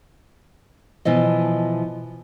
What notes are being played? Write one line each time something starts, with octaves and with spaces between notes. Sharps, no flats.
B2 E3 F3 D#5